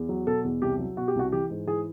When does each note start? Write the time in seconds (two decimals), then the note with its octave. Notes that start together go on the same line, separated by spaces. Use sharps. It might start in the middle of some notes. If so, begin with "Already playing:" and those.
Already playing: E2
0.09 F#3
0.27 B2 A4
0.44 E2
0.62 C2 G4
0.79 F#3
0.97 B2 F#4
1.08 G4
1.15 C2 F#4
1.32 E3 G4
1.50 G#2
1.67 E3 G#4